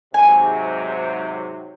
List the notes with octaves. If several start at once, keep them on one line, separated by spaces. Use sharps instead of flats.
G#2 C3 F#3 G#5